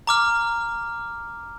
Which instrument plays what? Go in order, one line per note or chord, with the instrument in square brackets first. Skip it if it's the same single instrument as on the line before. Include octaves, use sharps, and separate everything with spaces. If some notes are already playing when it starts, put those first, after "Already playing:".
[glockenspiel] A#5 D6 F6